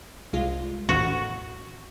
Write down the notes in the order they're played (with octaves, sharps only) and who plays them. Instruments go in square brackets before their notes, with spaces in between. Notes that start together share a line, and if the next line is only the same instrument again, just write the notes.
[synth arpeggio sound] C2 G#3 F4
[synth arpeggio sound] A1 D#2 [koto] F#4